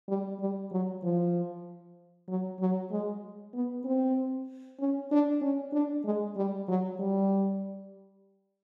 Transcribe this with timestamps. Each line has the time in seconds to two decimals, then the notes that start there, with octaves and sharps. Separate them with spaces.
0.08 G3
0.40 G3
0.71 F#3
1.03 F3
2.28 F#3
2.60 F#3
2.91 G#3
3.54 B3
3.85 C4
4.80 C#4
5.11 D4
5.41 C#4
5.73 D4
6.04 G#3
6.36 G3
6.68 F#3
6.99 G3